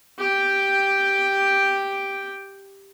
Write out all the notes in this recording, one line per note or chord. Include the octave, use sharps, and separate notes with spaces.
G4 G5